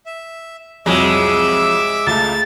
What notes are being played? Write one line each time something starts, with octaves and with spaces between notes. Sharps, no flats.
E5
C2 F2 F#3 G#3 E5 D6 E6
C#2 A3 A6